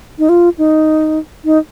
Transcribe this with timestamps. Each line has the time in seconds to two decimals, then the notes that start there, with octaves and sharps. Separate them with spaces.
0.19 D#4
0.29 F4
0.58 D#4
1.45 D#4